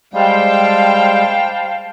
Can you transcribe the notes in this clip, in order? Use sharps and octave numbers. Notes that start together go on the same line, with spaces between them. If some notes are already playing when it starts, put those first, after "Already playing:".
G3 G#3 C5 F5 G5 A5